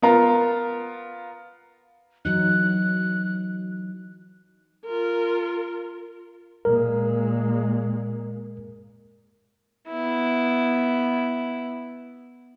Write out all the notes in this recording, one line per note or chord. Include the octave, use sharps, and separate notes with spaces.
B3 F4 A#4
E3 F#3 D#4 F#6
F4 A#4
A#2 G#3 A#4
B3 E4